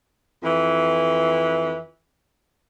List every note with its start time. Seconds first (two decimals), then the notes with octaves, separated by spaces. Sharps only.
0.43 F2 E3